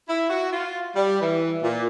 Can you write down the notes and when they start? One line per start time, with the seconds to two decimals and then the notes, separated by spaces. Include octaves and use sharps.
0.09 E4
0.30 F#4
0.52 F4
0.96 G3
1.21 E3
1.63 A#2